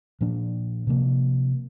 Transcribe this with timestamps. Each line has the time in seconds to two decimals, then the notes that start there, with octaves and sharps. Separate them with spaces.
0.21 A#2 F3 A#3 D4
0.87 C3 F3 A#3